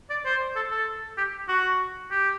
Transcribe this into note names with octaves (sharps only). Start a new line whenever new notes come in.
D5
C5
A4
A4
G4
F#4
G4